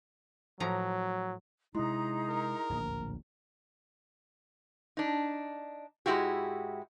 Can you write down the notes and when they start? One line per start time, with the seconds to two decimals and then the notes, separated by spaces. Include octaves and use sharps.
0.60 A2 F3 F#3 A#5
1.75 C3 G#3 D#4 E4 G#4 A#5 C6
2.30 A#4
2.70 D1 A#1 D#2
4.97 D4 D#4
6.06 G#2 G#3 C4 E4 F#4 G4